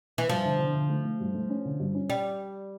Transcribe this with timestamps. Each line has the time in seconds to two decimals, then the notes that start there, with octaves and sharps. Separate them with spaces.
0.18 E3
0.29 G2 F3
0.45 D3
0.59 D3
0.75 D3
0.89 A3
1.04 A3
1.20 G2
1.34 A3
1.49 C#4
1.65 D3
1.80 G2
1.95 C#4
2.10 G3